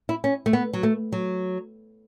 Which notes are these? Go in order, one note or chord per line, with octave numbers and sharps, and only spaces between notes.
E4
C#4
A3
B3
F#3
A3
F#3